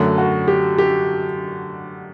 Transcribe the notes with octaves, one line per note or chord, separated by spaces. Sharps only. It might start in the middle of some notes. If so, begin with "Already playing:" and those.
Already playing: F#2 D3 F#3 A3
F#4
G4
G4